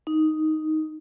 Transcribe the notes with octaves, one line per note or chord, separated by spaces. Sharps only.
D#4